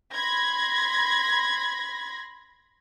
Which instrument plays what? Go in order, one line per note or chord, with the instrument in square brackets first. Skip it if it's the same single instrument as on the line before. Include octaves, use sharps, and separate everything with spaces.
[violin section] B5 C6 G#6 A#6